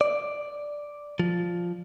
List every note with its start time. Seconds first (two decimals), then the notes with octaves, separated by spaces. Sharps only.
0.01 D5
1.20 F3